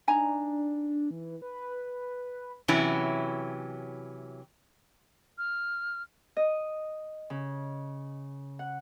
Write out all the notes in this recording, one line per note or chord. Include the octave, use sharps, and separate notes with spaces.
D4 D#4 G#5 A#5
E3
B4
C3 E3 F#3 C#4 E4
F6
D#5
C#3
F#5